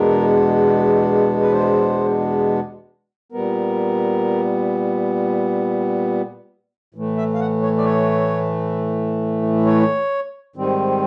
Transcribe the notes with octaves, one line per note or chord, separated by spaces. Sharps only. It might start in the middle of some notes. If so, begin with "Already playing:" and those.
Already playing: E2 B2 G#3 B3 D4 A#4
B4
C5
A#2 G3 B3 A#4
A2 E3 A3
E5
F5
F#5
C#5
D5
C#5
C#5
G#2 D#3 G3 C4